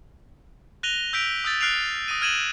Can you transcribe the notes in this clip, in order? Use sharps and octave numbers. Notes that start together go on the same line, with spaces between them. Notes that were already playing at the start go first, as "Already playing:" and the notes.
F#6 A#6 D#7 F7 G7
E6 G6 B6 D7 F7
D#6 E6 G6 A6
F6 F#6 C7 D7 F7
D#6 A#6 D#7
F6 G#6 D#7 E7 F#7